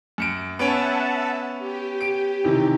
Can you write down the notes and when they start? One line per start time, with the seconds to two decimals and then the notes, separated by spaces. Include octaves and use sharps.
0.18 F#2 C#7 D7
0.59 B3 C#4 C#5 E5 F#5 A5 D7
1.59 G4
2.01 D7
2.44 C3 D#3 E3